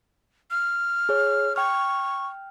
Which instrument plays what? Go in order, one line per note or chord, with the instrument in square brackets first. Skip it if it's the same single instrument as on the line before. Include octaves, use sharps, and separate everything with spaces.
[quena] F6
[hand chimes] G#4 C#5
[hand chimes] G5 F6 [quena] C#6